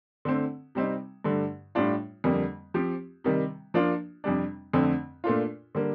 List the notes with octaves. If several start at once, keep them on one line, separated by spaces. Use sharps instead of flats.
D3 A3 C4
C3 G3 C4 D#4
G2 D3 A3
A2 G3 D4 F4
F2 D3 G3 A#3
F3 C4 G4
C3 D#3 G3
F3 A#3 D4 F4
F2 C3 G3 D4
F2 D3 A3 C4
A#2 A3 D4 F4
D3 G3 A#3